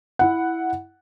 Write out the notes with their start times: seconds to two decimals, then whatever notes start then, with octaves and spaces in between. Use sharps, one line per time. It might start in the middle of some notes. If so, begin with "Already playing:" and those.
0.19 E4 F#5